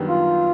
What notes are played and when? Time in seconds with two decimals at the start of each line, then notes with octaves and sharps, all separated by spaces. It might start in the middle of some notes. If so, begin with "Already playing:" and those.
Already playing: F#2 D#3 G3 B3 D4
0.08 F4